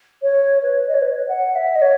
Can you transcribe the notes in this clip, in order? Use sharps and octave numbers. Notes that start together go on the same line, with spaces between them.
C#5
B4
D#5
C#5
B4
F#5
E5
D#5
C#5